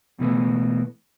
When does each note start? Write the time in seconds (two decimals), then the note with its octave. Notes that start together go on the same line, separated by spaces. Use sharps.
0.19 B2 E3 A3 B3